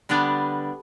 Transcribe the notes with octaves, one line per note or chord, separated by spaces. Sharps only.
D3 G3 B3 D4